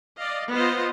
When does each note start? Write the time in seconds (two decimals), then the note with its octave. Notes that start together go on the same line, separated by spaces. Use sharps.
0.19 D5 D#5 F5
0.52 B3 F4 C5 D#5